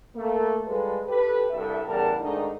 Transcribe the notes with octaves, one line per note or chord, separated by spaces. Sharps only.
A3 A#3
G3 G#3 F4 A4 B4
G4 A4 B4
C2 G2 A4 E5
E2 C#3 G3 A#4 F#5 A5
G#2 D#3 A3 D4 D#4